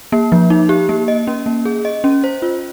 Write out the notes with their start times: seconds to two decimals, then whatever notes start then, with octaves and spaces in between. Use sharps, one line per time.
0.12 A#3
0.32 F3
0.50 D#4
0.69 G4
0.89 A#3
1.08 D#5
1.27 C#4
1.46 A#3
1.65 G#4
1.85 D#5
2.04 C#4
2.24 C5
2.42 F4